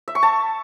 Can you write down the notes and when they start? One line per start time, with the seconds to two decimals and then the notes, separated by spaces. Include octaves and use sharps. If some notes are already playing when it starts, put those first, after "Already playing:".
0.08 E5
0.15 C#6
0.23 A5